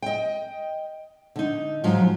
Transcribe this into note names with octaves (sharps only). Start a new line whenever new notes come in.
D#5 G5
D3 D#4
G#2 F3 F#3